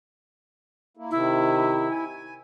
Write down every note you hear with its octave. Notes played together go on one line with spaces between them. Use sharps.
A#3 E4
C3 D#3 E4
G#5